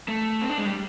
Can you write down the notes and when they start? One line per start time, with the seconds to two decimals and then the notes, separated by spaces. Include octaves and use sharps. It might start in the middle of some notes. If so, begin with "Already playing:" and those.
0.08 A3
0.42 C4
0.50 D4
0.58 G#3
0.65 G3